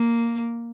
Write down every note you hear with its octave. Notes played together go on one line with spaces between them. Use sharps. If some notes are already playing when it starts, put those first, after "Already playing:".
Already playing: A#3